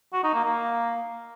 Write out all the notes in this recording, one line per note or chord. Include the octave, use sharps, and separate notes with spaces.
F#4
D#4
A#3
A#3